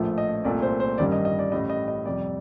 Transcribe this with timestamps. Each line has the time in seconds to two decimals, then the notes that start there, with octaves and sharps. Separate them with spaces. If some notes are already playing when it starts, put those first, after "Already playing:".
Already playing: A#1 A2 F3 A3
0.18 D#5
0.45 C2 A#2 A3 D5
0.62 C5
0.80 C5
0.98 A1 G2 D#3 G3 D5
1.12 D#5
1.25 D#5
1.39 D5
1.52 A1 A2 G3 D#5
1.70 D#5
1.88 D#5
2.05 F2 C3 G3 D5